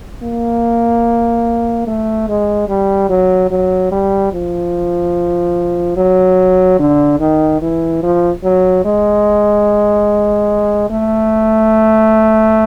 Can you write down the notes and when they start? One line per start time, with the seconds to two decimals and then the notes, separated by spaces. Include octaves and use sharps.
0.23 A#3
1.87 A3
2.28 G#3
2.68 G3
3.10 F#3
3.51 F#3
3.91 G3
4.33 F3
5.97 F#3
6.79 D3
7.20 D#3
7.61 E3
8.03 F3
8.44 F#3
8.85 G#3
10.90 A3